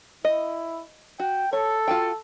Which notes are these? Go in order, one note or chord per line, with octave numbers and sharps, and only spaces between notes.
E4 D#5
F#4 G5
A4 C#5
F4 F#4 G5